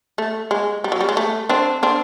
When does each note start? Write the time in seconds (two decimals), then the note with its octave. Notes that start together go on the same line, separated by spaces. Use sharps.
0.18 A3
0.51 G#3
0.84 G3
0.92 F#3
1.01 G3
1.09 G#3
1.17 A3
1.49 C4 D4
1.83 C4 D4